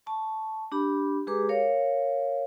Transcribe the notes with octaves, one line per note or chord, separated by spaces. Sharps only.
A5 C#6
D4 G4 B5
G#3 G4 G#4 B4 A#5 D6
A#4 C#5 F5